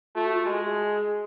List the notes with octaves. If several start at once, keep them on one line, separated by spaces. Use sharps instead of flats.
A3 F4
F#4
F4
G#3 F#4
G#4